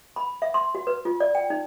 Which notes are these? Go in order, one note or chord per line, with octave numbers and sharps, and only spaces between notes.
B5
E5
C6
F#4
B4
F4
D5
G5
D#4